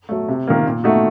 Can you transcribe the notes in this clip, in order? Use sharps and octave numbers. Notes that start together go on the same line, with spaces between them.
F#3 A3
C3
D#3 A#3 F4
A#2
A3 D#4 F#4